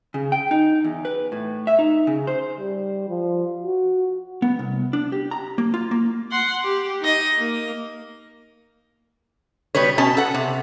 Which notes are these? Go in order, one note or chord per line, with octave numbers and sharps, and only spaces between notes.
C#3
G5
D#4
E2
B4
A2
E5
D#4
C#3
C5
G3
F3
F#4
B3
C2
D4
G4
A#5
A#3
F4
A#3
F#5 C6
G4
D#4 D#5
A#3
B2 G3 B4 C#5
B2 C#4 A5
A4 F#5
C3